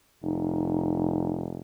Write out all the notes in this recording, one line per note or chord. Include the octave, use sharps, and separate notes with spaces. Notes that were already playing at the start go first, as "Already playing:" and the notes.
F1 D#4